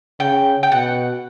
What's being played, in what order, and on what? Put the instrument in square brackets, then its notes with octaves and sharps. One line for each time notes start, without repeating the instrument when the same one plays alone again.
[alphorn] C#3 [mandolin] G5
[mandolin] G5
[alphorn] B2 [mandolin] F#5